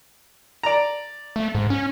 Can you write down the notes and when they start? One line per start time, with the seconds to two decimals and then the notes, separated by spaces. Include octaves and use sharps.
0.63 D5 A#5
1.36 A3
1.55 G#2
1.70 C#4